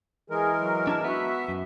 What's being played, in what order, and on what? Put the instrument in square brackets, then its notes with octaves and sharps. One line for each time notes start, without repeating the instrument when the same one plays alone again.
[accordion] E3 G#3 A#4 [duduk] G#4
[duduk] F#3
[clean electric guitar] D4 E4 A5
[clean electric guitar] B3 [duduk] F#4 [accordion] E5
[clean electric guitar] F#2